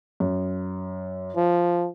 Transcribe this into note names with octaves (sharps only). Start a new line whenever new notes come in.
F#2
F3